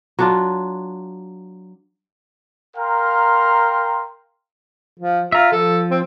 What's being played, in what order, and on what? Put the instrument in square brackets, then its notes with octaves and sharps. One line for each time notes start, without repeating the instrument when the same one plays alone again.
[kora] F#3 D4 F4
[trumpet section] A#4 F5 G5 A#5 C6
[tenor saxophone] F3
[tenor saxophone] F4 [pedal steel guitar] E5 A#5
[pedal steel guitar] F3 [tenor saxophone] A4
[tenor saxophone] C4